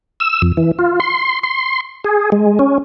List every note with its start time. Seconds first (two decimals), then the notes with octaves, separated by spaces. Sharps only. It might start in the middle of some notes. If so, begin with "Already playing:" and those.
0.20 E6
0.42 F2
0.57 E3
0.79 F4
1.00 C6
1.43 C6
2.05 G#4
2.32 G#3
2.59 C#4